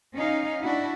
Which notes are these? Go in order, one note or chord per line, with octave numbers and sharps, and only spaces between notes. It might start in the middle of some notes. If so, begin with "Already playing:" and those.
C#4 D#4 F5
D4 E4 F#4